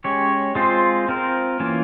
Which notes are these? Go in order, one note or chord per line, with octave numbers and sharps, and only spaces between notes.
G#3 C#4 G4 C#5
G#3 C4 F4 C5
C4 F4 A#4
E3 A#3 C#4 F4